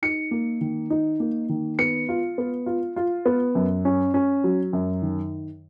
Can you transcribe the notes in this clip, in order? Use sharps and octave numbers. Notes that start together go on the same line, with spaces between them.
D#4 C#7
A#3
D#3
D#4
A#3
D#3
B3 C#7
F4
B3
F4
F4
B3
F#2
C#4
C#4
F#3
F#2
D#3